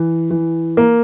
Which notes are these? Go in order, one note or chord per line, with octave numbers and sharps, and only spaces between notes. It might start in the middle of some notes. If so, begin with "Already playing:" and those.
Already playing: E3
E3
A#3